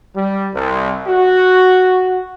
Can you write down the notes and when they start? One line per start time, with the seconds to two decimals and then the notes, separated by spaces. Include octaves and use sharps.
0.16 G3
0.54 C2
1.07 F#4